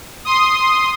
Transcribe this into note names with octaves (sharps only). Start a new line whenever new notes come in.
C6 D#6